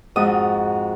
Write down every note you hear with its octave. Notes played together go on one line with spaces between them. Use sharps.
F2 G#2 F#4 D#6